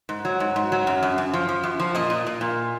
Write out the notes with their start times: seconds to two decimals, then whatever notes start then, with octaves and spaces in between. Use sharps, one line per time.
0.09 G#2
0.25 F#3
0.40 G#2
0.56 G#2
0.72 F#3
0.87 F#2
1.03 F#2
1.18 F#2
1.33 F3
1.49 F3
1.63 F#2
1.80 F3
1.95 A#2 D#5
2.10 A#2
2.27 A#2
2.41 A#2